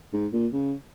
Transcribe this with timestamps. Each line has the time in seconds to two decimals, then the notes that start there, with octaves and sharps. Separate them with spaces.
0.13 G#2
0.33 A#2
0.53 C#3